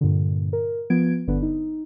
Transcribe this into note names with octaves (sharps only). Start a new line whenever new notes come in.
G2 A#2 D3
A#4
F3 B3 G#6 D7
G1 D3 B3 D4 B4
D#4